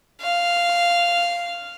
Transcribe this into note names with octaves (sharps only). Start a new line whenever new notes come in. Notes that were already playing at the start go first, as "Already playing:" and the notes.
F5